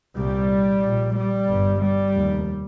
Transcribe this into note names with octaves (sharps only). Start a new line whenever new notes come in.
C2 A#2 G3
A#1 A#2
G3
G1 G2
G3
F1 D#2